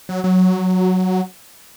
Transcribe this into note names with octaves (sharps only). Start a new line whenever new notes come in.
F#3
F#3